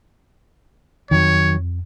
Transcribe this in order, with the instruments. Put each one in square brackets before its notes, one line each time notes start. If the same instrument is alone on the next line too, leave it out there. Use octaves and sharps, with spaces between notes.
[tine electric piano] F2 [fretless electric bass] D#3 F#3 [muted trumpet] C#5